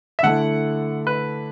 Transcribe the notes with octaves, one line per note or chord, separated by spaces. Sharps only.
E5
D3 A3 E4 A4 F#5
B4